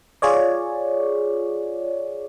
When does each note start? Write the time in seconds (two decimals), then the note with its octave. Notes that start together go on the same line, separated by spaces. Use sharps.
0.22 F4 G#4 C#5 D5